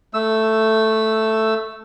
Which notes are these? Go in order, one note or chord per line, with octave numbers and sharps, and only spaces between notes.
A3 E6